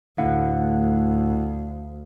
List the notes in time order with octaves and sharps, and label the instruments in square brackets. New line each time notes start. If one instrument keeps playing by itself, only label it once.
[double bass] D2 [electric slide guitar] A2 D3 [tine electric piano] E4 F#5 [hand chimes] F5